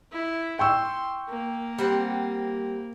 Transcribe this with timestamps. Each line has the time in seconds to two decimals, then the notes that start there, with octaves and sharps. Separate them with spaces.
0.12 E4
0.59 G5 C6 C#6 E6
1.29 A#3
1.79 G3 C4 F#5